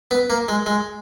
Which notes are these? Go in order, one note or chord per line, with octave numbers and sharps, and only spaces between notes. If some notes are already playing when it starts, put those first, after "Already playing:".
B3
A#3
G#3
G#3